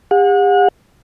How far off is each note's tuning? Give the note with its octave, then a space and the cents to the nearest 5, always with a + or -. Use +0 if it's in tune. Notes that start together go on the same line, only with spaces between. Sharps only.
G4 +45 F#5 -35